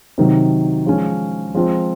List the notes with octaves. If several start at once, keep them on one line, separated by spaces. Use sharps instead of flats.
C3 D#3 F#3
F3 G#3 C#4
F3 G#3 C4 F4